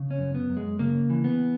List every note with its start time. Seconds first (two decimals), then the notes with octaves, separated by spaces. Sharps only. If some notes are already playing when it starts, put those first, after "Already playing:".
Already playing: C#3
0.11 C#4
0.19 F#2
0.34 B3
0.50 F#2
0.57 G#3
0.79 C#3 A#3
1.10 E3
1.24 B3